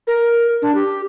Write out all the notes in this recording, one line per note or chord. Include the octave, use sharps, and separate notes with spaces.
A#4
D4
G4